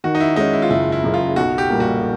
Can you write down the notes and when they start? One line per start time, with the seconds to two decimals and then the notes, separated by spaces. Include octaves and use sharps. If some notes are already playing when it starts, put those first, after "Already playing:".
0.04 D#3 F#4
0.15 D#4
0.20 E4
0.36 G#3 C#4 D#4
0.53 E4
0.62 F4
0.70 F#1 E4
0.92 E4
1.04 F#2 C#3
1.14 F4
1.36 B1 F#4
1.58 G4
1.70 A#2 G3 A#3
1.80 F#4